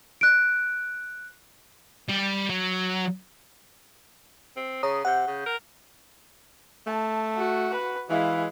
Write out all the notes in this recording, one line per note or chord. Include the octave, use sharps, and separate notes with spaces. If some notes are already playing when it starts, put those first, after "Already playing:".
F#6 D7
G3
F#3
C4
C#3 C#5 A#5 D#6
C3 F#5 G6
C#3
A#4
A3 A5
F#4
B4
E3 G#3 E4 F5